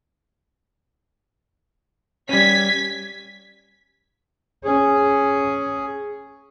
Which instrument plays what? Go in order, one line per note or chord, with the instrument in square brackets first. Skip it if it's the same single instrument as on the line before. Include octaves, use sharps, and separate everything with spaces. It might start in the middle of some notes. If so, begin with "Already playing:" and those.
[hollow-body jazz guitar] G3 C#4 [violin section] G#6 B6
[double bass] C#4 [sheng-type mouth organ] G#4